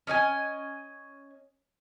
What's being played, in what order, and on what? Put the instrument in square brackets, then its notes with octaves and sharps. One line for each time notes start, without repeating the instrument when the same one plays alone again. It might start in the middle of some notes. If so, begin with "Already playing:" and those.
[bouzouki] C#4 D#5 F#5 G#5